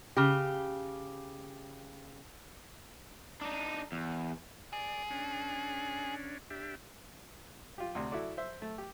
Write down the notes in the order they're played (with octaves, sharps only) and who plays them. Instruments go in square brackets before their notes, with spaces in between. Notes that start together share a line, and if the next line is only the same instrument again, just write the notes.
[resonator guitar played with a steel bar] C#3 G4
[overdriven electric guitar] D4 D#4
E2
[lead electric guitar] G#4 [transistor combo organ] D5
[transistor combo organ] C#4 D4
D4 G4 E5
[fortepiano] F4 G4
D2 C3
E4 F#4 A4 D5
C5 E5
A3
G4